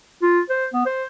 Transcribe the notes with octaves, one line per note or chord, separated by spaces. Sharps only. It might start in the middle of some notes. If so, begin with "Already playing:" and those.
F4
C5
B3
C5